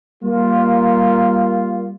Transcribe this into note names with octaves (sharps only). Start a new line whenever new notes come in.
G3 A#3 F4